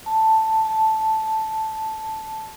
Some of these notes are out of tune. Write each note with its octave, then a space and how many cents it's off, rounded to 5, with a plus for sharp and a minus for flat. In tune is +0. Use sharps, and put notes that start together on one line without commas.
A5 +5
A5 -5